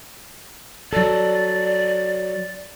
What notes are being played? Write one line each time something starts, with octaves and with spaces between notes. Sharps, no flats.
F#3 A4 D5